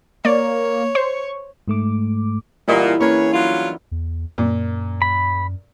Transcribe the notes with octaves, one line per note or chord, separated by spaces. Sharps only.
A#3 C#5 D5
C5 C#6
G#2 A3 D6
A#2 D3 E3 G3 E4 D#5 D#6
A#3 C#4 G#4 B4 C#5
F#3 G3 F4
E2
F#2 A#2
B5